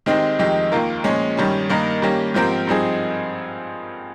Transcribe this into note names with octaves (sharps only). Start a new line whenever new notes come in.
D#3 G#3 C4 D#4 G4
F2 D#3 G#3 D#4 G4
D#2 D#3 A#3 F4 A#4
A#2 F3 G#3 C#4
G2 D#3 G3 C#4
G2 D#3 A#3 D#4 A#4
D#3 G3 A#3 C#4 G4
G#2 F3 C4 G4 A#4
G2 F3 C4 D#4 G#4